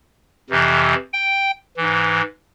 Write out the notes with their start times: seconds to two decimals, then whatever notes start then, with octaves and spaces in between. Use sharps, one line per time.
0.50 F2 C3 E3
1.13 G5
1.77 G#2 E3